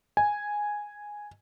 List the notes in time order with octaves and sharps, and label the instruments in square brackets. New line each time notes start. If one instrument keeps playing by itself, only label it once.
[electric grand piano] G#5